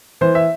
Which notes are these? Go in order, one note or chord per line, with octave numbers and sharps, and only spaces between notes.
E3 C5
E5